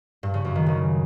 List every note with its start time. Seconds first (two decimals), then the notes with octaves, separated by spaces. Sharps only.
0.23 G2
0.34 C#3
0.45 F#2
0.56 D#3
0.66 C#3